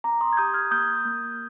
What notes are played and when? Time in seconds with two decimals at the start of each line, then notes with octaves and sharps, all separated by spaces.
0.04 C4 A#5 D6
0.21 C6 D#6
0.33 G#6
0.37 G4 D#6 G6
0.54 F6 G#6
0.71 A#3 D#6 G6
1.05 A#3